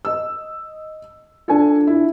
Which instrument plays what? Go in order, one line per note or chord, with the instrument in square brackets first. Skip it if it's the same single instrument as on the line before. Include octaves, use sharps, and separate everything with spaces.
[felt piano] D#5 E6
[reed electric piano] D4 F4 [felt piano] A4 G#5
[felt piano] E4